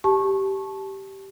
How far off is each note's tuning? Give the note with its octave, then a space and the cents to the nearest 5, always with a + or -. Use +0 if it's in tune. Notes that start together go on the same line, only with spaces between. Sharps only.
G4 -15 A5 -20 C#6 -20